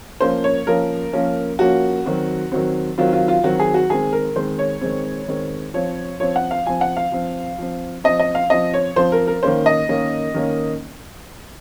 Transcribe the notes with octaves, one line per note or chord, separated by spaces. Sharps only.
F3 A#3 C#4 C5
C#5
F3 A#3 C#4 A#4
F3 A#3 C#4
F3 A#3 C#4 F#4
D#3 F#3 C4
D#3 F#3 C4
D#3 F#3 C4 F4
F4
F4
D#3 F#3 C4 F#4
G#4
F#4
D#3 G#3 C4 G#4
A#4
D#3 G#3 C4 C5
C#5
D#3 G#3 C4
D#3 G#3 C4
F3 C4 C#5
F3 C4 C#5
F#5
F5
F3 C4 G#5
F#5
F5
F3 C4
F3 C4
F3 C4 D#5
D#5
F5
F3 C4 D#5
C#5
F3 C4 C5
A#4
A#4
D#3 A#3 C#4 C5
D#5
D#3 A#3 C#4
D#3 A#3 C#4